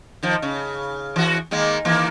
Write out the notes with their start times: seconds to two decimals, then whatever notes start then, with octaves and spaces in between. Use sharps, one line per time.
0.23 D#3 F3
0.42 C#3
1.16 E3 F#4
1.51 D#3 G#3 A#3
1.85 D#3 E3 A#3